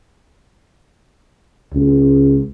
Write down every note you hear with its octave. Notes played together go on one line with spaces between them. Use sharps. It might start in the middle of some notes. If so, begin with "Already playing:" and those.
C#2